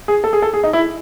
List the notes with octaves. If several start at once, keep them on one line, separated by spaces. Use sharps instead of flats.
G#4
A4
G#4
A4
G#4
D#4
E4